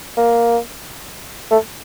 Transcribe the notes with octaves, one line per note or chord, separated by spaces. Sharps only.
A#3
A3